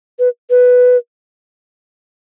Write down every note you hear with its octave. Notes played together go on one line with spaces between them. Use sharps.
B4
B4